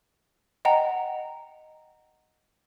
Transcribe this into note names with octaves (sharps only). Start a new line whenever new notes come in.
D#5 F#5 G5 A#5